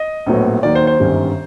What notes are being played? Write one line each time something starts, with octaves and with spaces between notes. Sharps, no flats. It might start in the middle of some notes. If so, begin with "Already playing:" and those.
Already playing: D#5
A#1 A2 F#3 B3
D#2 D#3 F#3 D5
C5
C5
G1 F#2 D#3 G3